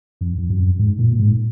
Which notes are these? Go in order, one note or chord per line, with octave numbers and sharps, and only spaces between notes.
F2
F2
F#2
G#2
A#2
G#2